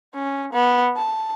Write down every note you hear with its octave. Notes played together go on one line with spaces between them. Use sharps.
C#4
B3
A5